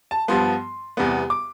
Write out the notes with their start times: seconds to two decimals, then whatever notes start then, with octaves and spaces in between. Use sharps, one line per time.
0.11 A5
0.28 G2 F3 B3 C6
0.97 E2 C3 G3 B3
1.30 D6